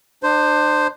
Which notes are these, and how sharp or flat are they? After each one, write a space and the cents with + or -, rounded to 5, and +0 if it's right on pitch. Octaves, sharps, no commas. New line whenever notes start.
D4 +35 C5 +0